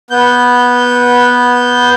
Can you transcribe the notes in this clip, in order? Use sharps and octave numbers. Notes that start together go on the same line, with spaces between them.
B3 G6